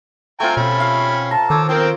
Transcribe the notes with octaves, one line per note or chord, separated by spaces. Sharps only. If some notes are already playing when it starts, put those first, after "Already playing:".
A3 C4 F4 G5 G#5 A#5
B2 C#4 B5
F5
A5 A#5
D#3 A4 C5 C#5 D6 E6
F3 C4 A#4 G5 E6